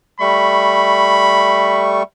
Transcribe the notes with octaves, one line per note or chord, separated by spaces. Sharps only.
G3 A3 B5 C#6